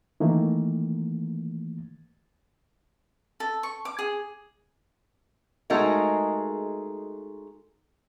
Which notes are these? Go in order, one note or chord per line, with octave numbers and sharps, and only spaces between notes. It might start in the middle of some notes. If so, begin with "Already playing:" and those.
D#3 E3 A3 A#3
A4
C#6
D6
G#4
G#3 A3 D#4 F#4 G#4 A#4